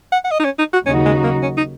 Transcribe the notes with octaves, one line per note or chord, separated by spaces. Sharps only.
F#5
F#5
D#5
D#4
C#4
D#4
F#4
D#2 C#3 F#3 C#4 D#4 F#4
G#3
A#3
C#4
D#4